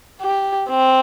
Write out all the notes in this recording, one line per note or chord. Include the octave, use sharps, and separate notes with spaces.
G4
C4